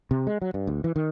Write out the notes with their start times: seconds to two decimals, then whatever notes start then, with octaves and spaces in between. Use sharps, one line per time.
0.11 C3
0.27 G#3
0.42 F#3
0.54 G2
0.67 D2
0.84 E3
0.96 D#3